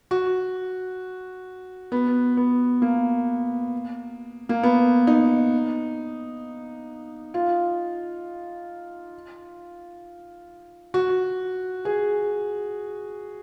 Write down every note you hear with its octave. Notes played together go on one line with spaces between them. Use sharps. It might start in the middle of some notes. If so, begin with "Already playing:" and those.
F#4
B3
B3
A#3
A#3
B3
D#4
F4
F#4
G#4